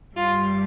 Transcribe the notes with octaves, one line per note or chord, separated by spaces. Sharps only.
G2 G3 F4